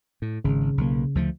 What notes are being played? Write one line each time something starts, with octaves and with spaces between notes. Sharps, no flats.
A2
G#1 C#3
B1 A#3
D2 F3 A3